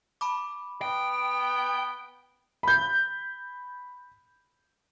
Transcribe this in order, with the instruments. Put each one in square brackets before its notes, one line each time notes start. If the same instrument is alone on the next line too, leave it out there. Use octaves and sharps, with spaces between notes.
[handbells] A5 B5 D6
[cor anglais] B3 [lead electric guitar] G5
[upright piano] B5 G6